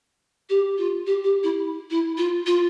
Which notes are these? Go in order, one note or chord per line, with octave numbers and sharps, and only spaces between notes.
G4
F4
G4
G4
E4
E4
F4
F4